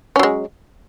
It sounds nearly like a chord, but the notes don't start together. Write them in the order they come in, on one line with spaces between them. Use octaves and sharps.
C#4 F#3 G#3